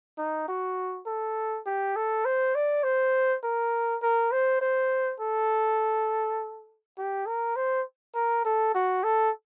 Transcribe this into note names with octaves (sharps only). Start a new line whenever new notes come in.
D#4
F#4
A4
G4
A4
C5
D5
C5
A#4
A#4
C5
C5
A4
G4
A#4
C5
A#4
A4
F#4
A4